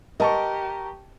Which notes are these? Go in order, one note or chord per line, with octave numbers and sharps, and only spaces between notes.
G4 A#4 D#5 A5 C#6